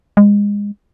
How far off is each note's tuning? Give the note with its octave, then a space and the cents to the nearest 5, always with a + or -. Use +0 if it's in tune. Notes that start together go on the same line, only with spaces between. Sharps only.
G#3 -25